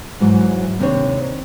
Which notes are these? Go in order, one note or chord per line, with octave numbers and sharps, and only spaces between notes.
G#2 E3 F#3
D#2 C3 C4 D4 C#5